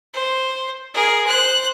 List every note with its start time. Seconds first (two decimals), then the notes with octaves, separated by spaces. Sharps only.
0.13 C5
0.94 G#4 A#4
1.26 C5 F#6